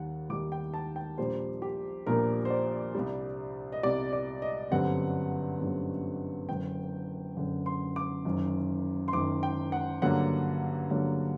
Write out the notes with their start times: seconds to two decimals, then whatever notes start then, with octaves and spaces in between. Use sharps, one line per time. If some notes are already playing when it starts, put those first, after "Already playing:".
Already playing: D#2 D#3 G3 F#5
0.30 D#2 D#3 G3 D6
0.52 G5
0.74 A5
0.96 G5
1.18 A#1 A#2 G3 A#3 C5
1.62 G4
2.06 A#1 A#2 G3 A#3 A#4
2.45 C5
2.50 D5
2.95 C2 C3 G3
3.72 D#5
3.83 C2 C3 G3 D5
4.13 D5
4.42 D#5
4.71 G1 F#2 D3 G3 C4 F#5
5.59 G1 F#2 D3 G3 C4
6.49 F#1 F#2 D3 G5
7.37 F#1 F#2 D3
7.66 C6
7.96 D6
8.25 F#1 F#2 D#3
9.08 C6
9.13 F#1 F#2 D#3 D6
9.43 G5
9.72 F#5
10.02 G2 D3 F#3 A#3 F#5
10.90 G2 D3 F#3 A#3